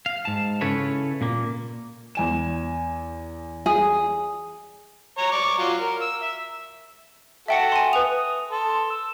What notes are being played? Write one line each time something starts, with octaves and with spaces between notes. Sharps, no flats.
F5
G#2 A5
C#3 C#4 E4 A4 B4 C#5
A#2 A#3
E2 G#5 E7
G#4
C#5 A#5
D5 C#6 D6
F#3 F4
A#4
E6
E5
F#4 A4 E5 G5 C#7
G#5 C6
B4 D#6 F7
A4 C6
E6